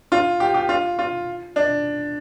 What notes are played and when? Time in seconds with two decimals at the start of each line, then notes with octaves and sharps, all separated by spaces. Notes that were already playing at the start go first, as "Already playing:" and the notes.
0.12 F4
0.40 G4
0.54 G4
0.69 F4
0.99 F4
1.56 D4